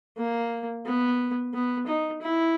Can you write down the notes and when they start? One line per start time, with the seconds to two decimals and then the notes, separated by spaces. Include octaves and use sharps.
0.17 A#3
0.85 B3
1.54 B3
1.87 D#4
2.22 E4